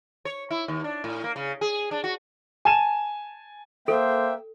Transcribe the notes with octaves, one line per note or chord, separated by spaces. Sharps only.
C#5
E4
D#2
D4
A2
A#3
C#3
G#4
D4
F#4
G#5 A5 D#7 E7
A#3 A4 C5 E5 G5